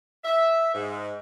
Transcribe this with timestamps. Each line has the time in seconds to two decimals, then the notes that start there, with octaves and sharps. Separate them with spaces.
0.24 E5
0.74 G#2